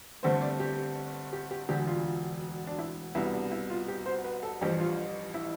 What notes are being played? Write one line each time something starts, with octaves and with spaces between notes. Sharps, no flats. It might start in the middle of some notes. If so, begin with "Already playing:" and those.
G1 G2 D3 A3 C4 C5
D5
G4
G4
G4
E1 D2 D3 G4
F4
D4
E4
C2 B2 B3 E4
D4
E4
F4
G4
C5
B4
A4
A1 G2 F3 G4
F4
E4